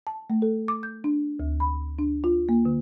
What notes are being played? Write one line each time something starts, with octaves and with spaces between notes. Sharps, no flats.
A5
A3
A4
D6
G6
D4
D2
B5
D4
F4
A#3
D3